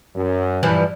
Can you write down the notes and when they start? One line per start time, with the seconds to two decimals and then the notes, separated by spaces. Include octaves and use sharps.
0.16 F#2
0.63 G2 E3 F3